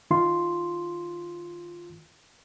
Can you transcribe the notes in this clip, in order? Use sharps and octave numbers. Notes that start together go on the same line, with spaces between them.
D#3 F4 C6